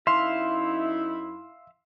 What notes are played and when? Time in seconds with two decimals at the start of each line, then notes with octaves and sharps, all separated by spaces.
0.07 F#2 D#4 E4 E5 F5 C6